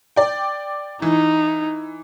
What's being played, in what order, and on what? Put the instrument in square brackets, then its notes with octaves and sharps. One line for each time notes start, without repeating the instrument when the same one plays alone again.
[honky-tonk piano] D5 G5
[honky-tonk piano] E3 [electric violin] D#4